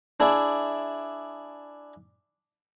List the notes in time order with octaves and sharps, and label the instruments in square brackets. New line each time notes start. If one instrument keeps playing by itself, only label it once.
[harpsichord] D4 E4 G#4 D5 E5